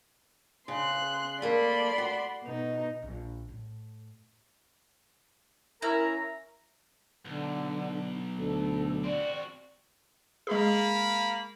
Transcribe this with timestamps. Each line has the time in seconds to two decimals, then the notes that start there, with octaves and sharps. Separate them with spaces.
0.68 C#3 C6 F#6
1.42 A3 A#3 D5 B5 C6
1.98 F#4
2.43 B2 D#4
3.02 A#1
3.48 A2
5.82 C#4 E4 A#4 A#5
7.25 B1 D3
8.39 D2 A4
9.04 C4 F#4 D5
10.47 G#3 A#3 G#4 F5 B5